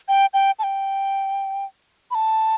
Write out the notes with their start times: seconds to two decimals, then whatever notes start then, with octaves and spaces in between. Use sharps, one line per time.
0.08 G5
0.34 G5
0.59 A5
0.63 G5
2.11 B5
2.15 A5